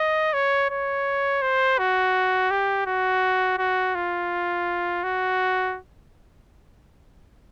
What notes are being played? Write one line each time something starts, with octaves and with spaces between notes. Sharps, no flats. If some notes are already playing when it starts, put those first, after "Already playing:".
Already playing: D#5
C#5
C#5
C5
F#4
G4
F#4
F#4
F4
F#4